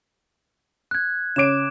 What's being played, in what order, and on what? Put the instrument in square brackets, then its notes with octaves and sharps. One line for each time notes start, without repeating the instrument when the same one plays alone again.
[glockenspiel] F#6 G#6
[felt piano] C#3 C#5 D7 [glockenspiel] D6 E7